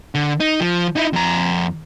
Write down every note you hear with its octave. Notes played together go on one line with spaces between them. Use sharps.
D3
D#4
F3
D#4 E4
F2 A#5